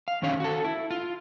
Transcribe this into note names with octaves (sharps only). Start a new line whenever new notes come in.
F5
F#2 D#3 F#3 C#4 C#5 F5
F#4 A4
E4
F4